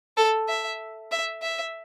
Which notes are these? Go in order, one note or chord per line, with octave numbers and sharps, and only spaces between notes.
A4
E5
E5
E5